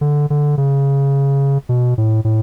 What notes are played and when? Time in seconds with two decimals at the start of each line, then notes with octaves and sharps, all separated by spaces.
0.01 D3
0.30 D3
0.58 C#3
1.69 B2
1.98 A2
2.25 A2